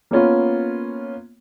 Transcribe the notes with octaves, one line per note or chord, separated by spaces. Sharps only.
A#3 B3 C#4 F4